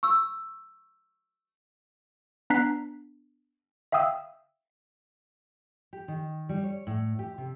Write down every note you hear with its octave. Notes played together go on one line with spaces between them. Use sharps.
C#6 E6
B3 D4 A#5 F#6 B6 C7
E5 F5 G5 D#6 E6
G4
D#3
G3
C#5
A2
G4
C3